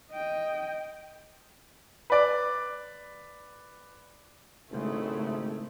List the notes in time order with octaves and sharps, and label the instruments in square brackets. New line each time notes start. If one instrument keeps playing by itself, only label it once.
[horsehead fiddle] D#5 G5
[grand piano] B4 D5
[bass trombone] G#1 [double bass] C#3 G#3 [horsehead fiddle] A3 E4